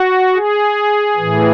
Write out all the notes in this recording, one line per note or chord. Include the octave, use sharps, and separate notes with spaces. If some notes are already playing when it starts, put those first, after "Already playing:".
Already playing: F#4
G#4
A2 E3